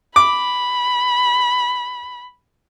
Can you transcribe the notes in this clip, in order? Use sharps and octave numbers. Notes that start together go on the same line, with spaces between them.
B5 D6